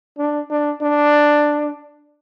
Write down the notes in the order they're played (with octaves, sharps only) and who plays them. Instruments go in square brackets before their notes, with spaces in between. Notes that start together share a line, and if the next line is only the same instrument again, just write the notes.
[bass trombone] D4
D4
D4